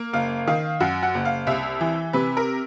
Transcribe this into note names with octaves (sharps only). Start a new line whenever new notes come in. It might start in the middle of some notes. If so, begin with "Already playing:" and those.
Already playing: A#3
F#1 F5
D#3 F5
F#2 F#5
F#5
F#1
F5
C2 E5
E3
C3 B4
A#4